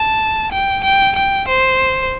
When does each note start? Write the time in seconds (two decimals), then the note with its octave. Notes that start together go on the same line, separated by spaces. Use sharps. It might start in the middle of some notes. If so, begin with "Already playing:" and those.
Already playing: A5
0.52 G5
0.84 G5
1.16 G5
1.48 C5